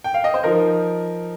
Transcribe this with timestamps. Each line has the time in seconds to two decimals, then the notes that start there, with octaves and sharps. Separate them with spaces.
0.04 G5
0.14 F5
0.24 D#5
0.34 C5
0.43 F3 D#4 A#4